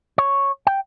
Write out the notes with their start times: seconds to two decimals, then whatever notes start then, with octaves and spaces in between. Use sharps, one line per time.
0.18 C#5
0.67 G5